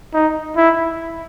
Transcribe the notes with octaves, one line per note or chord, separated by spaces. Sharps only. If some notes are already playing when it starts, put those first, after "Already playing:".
D#4
E4